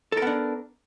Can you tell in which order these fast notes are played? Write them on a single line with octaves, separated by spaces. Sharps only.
A4 A#4 B3 D4